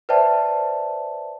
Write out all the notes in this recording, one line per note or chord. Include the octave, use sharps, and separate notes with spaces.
B4 C5 D5 E5 G5 A5